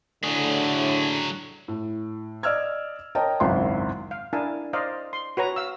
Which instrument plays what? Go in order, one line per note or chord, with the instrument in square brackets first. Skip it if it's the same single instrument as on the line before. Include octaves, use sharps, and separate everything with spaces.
[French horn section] A2 D3 [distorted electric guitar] F#3 G#4
[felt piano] A2
D5 D#5 E6 F6 G#6
A#4 C#5 D#5 G5 A5 A#5
G#1 C#2 F#2 E4 C6
[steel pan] F5
D4 E4 A#4 F5 G#5 A5
C5 D5 D#5 F5 A#5
C6
F#4 B4 C#5 A#5
F5 E6